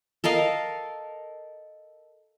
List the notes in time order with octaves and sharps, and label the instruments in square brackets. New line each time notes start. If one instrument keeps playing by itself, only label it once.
[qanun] A4 A#4 D#5 F5